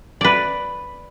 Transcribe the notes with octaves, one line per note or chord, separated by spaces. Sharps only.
B4 D5